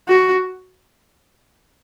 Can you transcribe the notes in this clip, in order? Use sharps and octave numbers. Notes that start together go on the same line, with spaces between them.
F#4